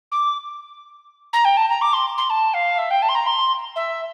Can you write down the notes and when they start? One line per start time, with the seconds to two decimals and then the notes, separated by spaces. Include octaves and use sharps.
0.12 D6
1.33 A#5
1.45 G5
1.57 A5
1.69 A#5
1.81 D6
1.93 C6
2.18 C6
2.30 A5
2.54 F5
2.78 E5
2.90 G5
3.02 A5
3.09 C6
3.15 A#5
3.26 C6
3.76 E5